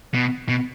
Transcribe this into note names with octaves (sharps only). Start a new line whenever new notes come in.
B2
B2